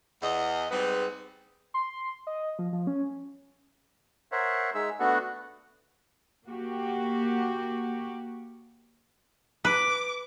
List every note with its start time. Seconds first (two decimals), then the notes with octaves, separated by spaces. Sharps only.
0.23 E2 D#5
0.71 G#2 G3 G#3 B3 C4 B4
1.74 C6
2.27 D#5
2.59 F3
2.73 F3
2.87 C#4
4.32 A#4 C5 C#5 E5 F#5
4.75 G#3 D#4 G#4 E5 E6
5.00 A3 B3 D4 F#4 A4 F#5
6.46 A#3 F#4 G4
9.65 B4 D6